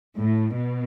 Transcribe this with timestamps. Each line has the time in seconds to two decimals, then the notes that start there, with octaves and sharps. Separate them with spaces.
0.19 A2
0.55 B2